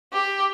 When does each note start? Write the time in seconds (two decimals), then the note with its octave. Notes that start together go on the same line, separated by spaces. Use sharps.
0.13 G4